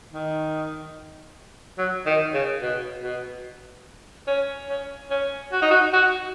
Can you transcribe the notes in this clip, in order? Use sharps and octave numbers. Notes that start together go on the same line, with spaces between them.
D#3
F#3
D#3
C#3
B2
B2
C#4
C#4
C#4
F#4
D#4
F#4
F#4